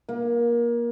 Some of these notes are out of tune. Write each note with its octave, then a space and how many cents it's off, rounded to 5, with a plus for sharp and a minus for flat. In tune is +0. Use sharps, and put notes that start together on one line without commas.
A#3 +25